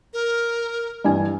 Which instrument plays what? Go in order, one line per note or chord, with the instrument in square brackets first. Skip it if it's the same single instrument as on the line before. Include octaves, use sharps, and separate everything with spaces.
[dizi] A#4
[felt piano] G2 E3 G#5